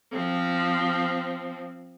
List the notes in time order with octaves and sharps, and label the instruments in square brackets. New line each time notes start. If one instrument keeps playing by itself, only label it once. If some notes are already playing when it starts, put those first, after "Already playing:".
[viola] F3 C4